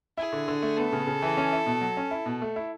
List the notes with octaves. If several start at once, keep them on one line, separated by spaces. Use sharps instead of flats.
E4 G#4
D3
D3
A3
B3 A4
C#3
C#3
E3
C#4
E4
B2
F#3
C#4
E4
B2
A3
E4